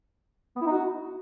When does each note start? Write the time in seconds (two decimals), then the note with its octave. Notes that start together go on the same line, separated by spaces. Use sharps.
0.56 B3
0.61 E4
0.66 D#4
0.71 F#4